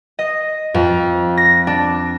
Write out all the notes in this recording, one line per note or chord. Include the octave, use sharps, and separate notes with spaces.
D#5
F2
A#6
D4